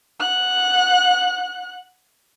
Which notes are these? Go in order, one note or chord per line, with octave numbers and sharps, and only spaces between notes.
F#5 F#6